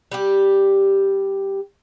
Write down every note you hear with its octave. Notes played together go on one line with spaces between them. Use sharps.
G3 G4